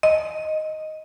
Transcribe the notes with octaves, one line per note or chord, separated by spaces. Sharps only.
D#5